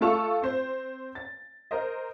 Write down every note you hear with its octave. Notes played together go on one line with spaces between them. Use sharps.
A3 F4 A4 C#6 F7
C4 C5
A6
A#4 C5 D#5